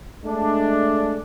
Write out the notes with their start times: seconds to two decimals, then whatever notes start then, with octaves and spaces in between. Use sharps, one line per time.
0.25 G#3 A3 D4